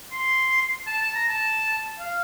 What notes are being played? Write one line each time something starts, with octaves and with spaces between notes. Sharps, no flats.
C6
A5
A5
A#5
A5
F5